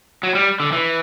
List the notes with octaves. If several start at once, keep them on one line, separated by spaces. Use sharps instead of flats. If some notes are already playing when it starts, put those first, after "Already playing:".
F#3
G3
D3
E3